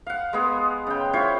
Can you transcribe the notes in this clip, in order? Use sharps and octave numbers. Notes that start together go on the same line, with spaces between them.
F5 F#5
G#3 B3 G#4
C#3 G5
E4 F4 C5 C#5